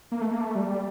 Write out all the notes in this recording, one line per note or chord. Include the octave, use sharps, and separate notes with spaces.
A#3
A3
A#3
A3
G3
G3